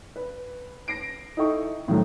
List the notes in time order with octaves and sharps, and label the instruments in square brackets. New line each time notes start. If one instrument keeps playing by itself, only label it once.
[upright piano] B4
A#6 C7 D7
D#4 E4 A4 D#5 G5 C#6
A1 A2 D#3 F3 F#3 A3